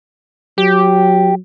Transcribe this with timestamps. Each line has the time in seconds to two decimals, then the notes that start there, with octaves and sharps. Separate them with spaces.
0.58 F#3 G4